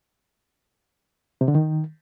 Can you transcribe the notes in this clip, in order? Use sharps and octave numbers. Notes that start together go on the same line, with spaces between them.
C3
D3
D#3